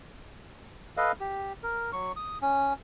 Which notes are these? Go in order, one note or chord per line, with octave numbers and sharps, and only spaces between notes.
A4 B4 D#5 F5
G4
A#4
F#3 C#6
D#6
C#4